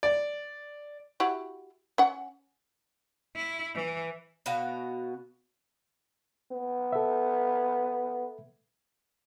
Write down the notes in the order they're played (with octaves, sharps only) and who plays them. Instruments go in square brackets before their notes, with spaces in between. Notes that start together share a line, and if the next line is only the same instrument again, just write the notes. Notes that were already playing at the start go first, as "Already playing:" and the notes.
[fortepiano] D5
[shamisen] E4 F#4 G4
C#4 F#5
[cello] E4
E3
[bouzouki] B2 B3 F#4 F5
[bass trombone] B3
[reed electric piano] A4 E5